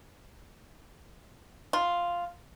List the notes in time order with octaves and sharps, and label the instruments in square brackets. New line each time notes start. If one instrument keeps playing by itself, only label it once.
[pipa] F4